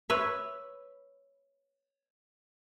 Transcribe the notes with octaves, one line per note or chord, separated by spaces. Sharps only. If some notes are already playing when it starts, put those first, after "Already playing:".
B4 C#5 E5